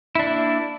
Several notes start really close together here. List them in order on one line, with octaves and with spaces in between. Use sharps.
E4 D4 A#3